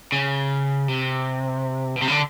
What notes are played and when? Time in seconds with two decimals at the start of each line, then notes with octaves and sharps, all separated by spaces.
0.12 C#3
0.88 C3
1.96 B2
2.02 C3
2.08 C#3
2.11 D3